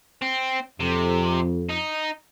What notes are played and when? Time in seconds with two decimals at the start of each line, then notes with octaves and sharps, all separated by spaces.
0.22 C4
0.80 F2 C3
1.70 D#4